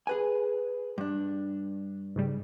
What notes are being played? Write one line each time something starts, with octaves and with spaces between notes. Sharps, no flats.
G#4 B4 G#5
G2 D4
G#2 C#3 G3